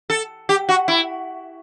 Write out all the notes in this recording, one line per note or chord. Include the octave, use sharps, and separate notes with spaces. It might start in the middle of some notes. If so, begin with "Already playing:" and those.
A4
G4
F#4
E4